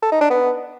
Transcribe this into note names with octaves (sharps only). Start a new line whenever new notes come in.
A4
D#4
D4
B3